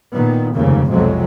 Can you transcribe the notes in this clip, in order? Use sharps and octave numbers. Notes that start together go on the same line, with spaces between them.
A#2 D#3 B3
F1 D#2 G#2 C#3 A#3
B1 F2 C3 F3 F#3 G#3